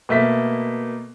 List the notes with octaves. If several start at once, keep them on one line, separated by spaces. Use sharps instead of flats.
B2 A3 A#3 B6